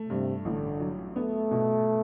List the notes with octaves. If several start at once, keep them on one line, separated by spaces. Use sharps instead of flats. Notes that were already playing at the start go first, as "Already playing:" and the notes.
Already playing: A3
G2 C3
A1 D3
F#3
A3 B3
B2